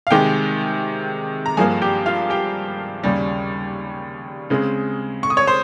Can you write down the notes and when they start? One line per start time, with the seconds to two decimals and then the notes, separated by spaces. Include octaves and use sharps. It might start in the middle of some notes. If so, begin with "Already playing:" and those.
0.07 F5
0.11 C3 D#3 G#3 G4 G5
1.46 A#5
1.57 G2 F3 A#3 G#4 G#5
1.82 G4 G5
2.06 F4 F5
2.30 G4 G5
3.04 D#2 C#3 G3
4.50 C#3 G#3 C4
5.23 C#6
5.30 D#6
5.37 C#5 C#6
5.47 C5 C6